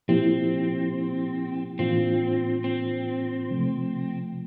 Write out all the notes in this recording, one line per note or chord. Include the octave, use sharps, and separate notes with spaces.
A#2 F3 A#3 C4 E4 G4
A2 E3 A#3 C4 D4 F4
C4
C3 F3 A3